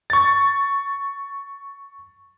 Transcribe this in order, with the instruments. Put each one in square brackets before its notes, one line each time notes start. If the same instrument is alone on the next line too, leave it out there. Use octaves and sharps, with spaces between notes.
[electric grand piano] C#6 A6